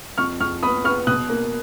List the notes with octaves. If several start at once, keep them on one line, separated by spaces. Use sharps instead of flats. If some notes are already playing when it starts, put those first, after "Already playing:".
F2 C#6 F6
F2 C#6 F6
B3 B5 D#6
B3 C#6 F6
B2 D#6 F#6
A#3